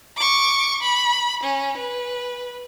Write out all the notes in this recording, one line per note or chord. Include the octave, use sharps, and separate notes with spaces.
C#6 D6
B5
C#4
B4